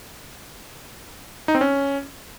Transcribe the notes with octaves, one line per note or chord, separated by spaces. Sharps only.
D#4
C4
C#4